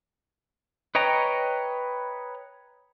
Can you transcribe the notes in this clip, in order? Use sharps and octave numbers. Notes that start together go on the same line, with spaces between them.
B4 C#5 D#5 G5 A#5